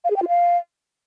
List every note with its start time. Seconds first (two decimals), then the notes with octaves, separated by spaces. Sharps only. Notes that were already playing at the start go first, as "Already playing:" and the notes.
0.04 F5
0.10 G#4
0.16 G5
0.22 F4
0.28 F5